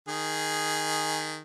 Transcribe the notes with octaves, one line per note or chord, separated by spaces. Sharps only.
D#3 G#4